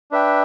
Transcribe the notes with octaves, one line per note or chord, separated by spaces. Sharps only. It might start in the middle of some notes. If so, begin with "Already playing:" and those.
D4 B4 E5 G5